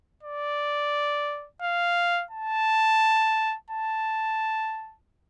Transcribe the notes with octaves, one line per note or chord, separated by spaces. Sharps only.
D5
F5
A5
A5